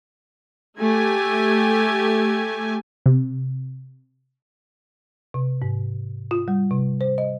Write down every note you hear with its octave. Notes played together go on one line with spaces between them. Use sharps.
A3 G4 G#5
C3
C3
G#2
F4
G3
C3
C5
D#5